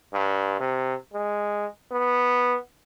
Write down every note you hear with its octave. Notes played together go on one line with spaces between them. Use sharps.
G2
C3
G#3
B3